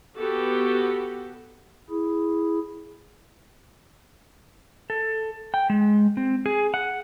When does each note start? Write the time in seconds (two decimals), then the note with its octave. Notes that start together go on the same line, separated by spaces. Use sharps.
0.17 B3 F#4 G4 A4
1.90 E4 G#4
4.90 A4
5.54 G5
5.70 G#3
6.17 C4
6.46 G#4
6.74 F#5